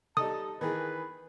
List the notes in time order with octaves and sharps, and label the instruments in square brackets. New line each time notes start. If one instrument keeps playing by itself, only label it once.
[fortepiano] G3 D#4 A4 [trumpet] A5 [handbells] D#6
[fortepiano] D#3 E3 G#4 [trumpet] B4